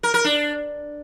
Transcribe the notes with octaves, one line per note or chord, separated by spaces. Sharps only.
A#4
A#4
D4